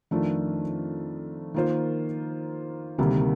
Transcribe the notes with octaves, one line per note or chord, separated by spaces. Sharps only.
F2 D#3 A3 D4 F4
D#3 A#3 F4 C5
D2 C3 D#3 G3 A#3